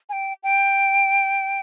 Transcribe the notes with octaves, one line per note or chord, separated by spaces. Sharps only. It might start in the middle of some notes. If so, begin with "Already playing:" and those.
G#5
G5
G5